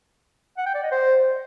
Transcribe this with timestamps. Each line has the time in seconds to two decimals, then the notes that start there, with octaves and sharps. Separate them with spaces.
0.58 F#5
0.66 G5
0.75 D5
0.83 D#5
0.92 C5